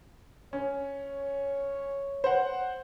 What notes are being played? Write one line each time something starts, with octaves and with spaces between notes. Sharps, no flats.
C#4 C#5
C5 F#5